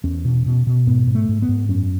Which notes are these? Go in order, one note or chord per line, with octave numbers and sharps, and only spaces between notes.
E2 C#4
B2
B2
B2
G#2 B3
G#2
A3
G#2
B3
G#2
F#2 C#4